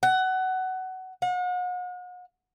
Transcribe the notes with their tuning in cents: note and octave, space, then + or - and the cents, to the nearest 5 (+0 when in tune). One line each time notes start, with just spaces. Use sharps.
F#5 +20
F#5 -40